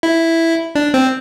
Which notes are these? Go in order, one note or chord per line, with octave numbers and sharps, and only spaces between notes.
E4
D4
C4